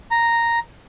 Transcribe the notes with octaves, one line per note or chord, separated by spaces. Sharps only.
A#5